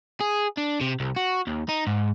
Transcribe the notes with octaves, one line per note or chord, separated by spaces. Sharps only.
G#4
D4
C3
C2
F#4
D#2
D#4
G#2